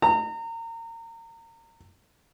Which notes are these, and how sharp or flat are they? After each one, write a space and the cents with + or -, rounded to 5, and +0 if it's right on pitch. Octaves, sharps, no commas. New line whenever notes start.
A#5 -30